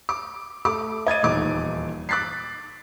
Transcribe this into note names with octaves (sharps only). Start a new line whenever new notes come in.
D6
A3 D6
D#5 G#6 A6 D#7
D#1 E2 D#4 D6
D6 F#6 A6 B6 C7